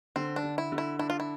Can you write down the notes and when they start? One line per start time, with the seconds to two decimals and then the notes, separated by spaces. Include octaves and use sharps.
0.16 D3 C4
0.36 D4
0.44 D3
0.58 E4
0.72 D3
0.78 E4
0.99 D4 E4
1.10 F4
1.20 E4